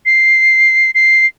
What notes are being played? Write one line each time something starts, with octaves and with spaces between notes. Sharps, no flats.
C7
C7